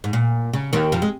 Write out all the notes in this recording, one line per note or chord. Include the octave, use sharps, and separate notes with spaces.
G#2
A#2
C#3
D#2 D#3
F2 F3
G#3